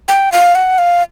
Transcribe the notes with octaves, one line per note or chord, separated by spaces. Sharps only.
G5
F5
F#5
F5